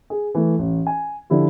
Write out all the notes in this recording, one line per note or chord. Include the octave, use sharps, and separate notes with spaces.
G#4
E3 A3
A1
G#5
D3 F3 E4 G4